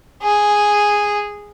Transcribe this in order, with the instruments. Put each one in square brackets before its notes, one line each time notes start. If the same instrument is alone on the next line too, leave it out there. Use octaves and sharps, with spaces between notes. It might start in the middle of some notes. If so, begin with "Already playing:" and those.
[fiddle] G#4